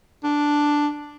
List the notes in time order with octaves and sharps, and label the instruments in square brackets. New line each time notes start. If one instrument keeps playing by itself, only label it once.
[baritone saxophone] D4